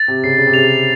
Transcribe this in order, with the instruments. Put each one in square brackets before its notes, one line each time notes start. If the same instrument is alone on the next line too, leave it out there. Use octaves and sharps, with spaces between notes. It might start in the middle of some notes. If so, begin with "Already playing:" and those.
Already playing: [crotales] A6
[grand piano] C3
[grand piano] C#3 [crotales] C7
[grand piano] C#3
C3
[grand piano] C#3 [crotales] F7